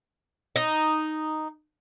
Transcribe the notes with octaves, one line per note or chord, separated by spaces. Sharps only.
D#4